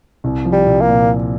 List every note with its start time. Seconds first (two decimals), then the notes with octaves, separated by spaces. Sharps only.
0.24 C2
0.45 F3
0.52 G3
0.66 C2
0.81 A#3
0.88 A#2